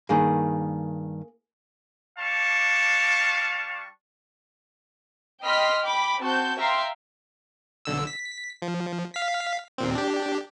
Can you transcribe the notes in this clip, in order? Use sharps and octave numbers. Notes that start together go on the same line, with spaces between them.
G2 D#3 A#3 G#4
G3 D4 F5 A5 C#6
D#5 G5 B5 C6 F6 B6
G5 B5 D6
C4 F#4 A5 G6
E5 F5 G5 A#5 C6
B1 D3 E6
B6
F3
F5 B6
D#2 A#2 C4
D4 G4